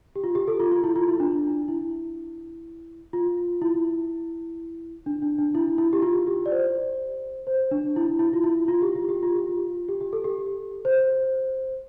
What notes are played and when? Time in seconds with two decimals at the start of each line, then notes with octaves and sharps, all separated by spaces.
0.16 G4
0.24 F4
0.35 G4
0.48 A4
0.60 F4
0.72 F4
0.84 E4
0.96 F4
1.08 E4
1.20 D4
1.68 E4
3.13 F4
3.62 E4
5.06 D4
5.22 D4
5.38 D4
5.55 E4
5.78 E4
5.93 G4
6.02 F4
6.27 G4
6.46 D5
6.51 C5
7.47 C5
7.71 D4
7.96 E4
8.19 E4
8.33 F4
8.44 E4
8.68 F4
8.82 G4
8.95 F4
9.09 G4
9.23 F4
9.36 G4
9.49 F4
9.89 G4
10.01 G4
10.13 A4
10.24 G4
10.85 C5